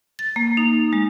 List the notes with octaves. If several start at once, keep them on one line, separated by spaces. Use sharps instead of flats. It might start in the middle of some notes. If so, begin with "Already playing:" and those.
A6
A#3
D#4
G#3